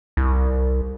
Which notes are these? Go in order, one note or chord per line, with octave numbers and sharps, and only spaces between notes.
C2